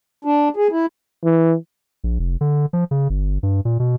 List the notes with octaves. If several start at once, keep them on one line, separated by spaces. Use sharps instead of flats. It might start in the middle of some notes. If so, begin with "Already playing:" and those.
D4
G#4
E4
E3
A#1
F1
D3
F3
C#3
G1
G2
A#2
B2